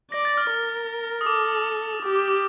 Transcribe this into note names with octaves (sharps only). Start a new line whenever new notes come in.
D5 A#6
A6
F6
A#4
D#6
A4 D6
G4 D6
D6
D6